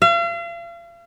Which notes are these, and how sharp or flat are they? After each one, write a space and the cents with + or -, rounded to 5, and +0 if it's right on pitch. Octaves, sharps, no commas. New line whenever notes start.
F5 -40